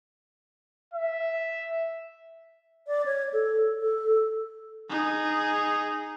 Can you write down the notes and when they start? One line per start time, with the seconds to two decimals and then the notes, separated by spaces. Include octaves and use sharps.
0.94 E5
2.87 D5
3.06 C#5
3.33 A4
3.80 A4
4.89 D#4 G#4